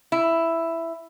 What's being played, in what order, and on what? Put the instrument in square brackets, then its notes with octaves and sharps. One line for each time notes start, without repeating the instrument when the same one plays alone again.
[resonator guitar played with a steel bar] E4